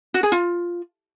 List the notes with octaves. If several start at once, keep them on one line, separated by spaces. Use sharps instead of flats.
F#4
G#4
F4